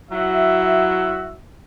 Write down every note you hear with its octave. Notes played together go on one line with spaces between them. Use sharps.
F#3 E4 F#4 E5